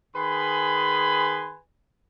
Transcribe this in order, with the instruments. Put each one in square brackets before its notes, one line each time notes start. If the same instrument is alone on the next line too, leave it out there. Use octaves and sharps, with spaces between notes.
[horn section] D#3 G#4 B4 G#5 B5 C6